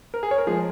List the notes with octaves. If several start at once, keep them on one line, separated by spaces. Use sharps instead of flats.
A#4
G#4
C#5
A#4
F3 G#3 G#4